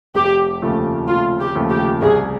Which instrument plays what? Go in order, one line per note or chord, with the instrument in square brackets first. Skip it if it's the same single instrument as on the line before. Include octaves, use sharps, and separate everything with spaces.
[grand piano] F1 [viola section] G4
[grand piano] D#2 C#3 F3 A3
[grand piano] F1 [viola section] F4
[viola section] G4
[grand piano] D#2 C#3 F3 A3
[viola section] G4
[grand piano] C2 [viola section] G#4